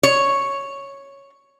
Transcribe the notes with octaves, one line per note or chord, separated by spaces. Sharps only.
C#5